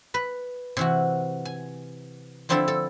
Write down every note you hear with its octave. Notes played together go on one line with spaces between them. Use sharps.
B4 B5
C3 E3 F#4
G#5
D3 F3 C4 D4 E4 A4
A4